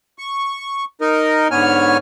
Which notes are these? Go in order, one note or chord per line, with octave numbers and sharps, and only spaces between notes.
C#6
D#4 A#4 D#5
G#2 D3 B3 C#5 G#5 F6